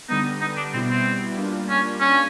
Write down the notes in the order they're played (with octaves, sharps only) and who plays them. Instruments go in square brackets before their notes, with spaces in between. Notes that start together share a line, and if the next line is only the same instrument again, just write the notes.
[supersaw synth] D3 G3 B3 [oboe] D#4
[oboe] D#4
D4
[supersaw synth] B2 G3 B3 E4 [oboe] C4
[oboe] C4
[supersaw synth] G3 A#3 D4 F4
[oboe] C#4
C#4